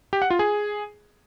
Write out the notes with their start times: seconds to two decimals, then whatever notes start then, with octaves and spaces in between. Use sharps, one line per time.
0.13 G4
0.22 F#5
0.30 F4
0.39 G#4